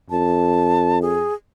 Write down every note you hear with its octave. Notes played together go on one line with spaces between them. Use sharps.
F2 A5
G#4